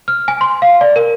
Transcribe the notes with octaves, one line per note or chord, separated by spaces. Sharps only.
F6
G#5
C6
F5
D5
A#4